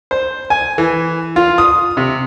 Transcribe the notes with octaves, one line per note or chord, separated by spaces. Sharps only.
C5
G#5
E3
F4
D#6
C3